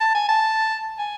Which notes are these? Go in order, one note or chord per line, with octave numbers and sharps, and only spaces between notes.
A5
G#5
A5
G#5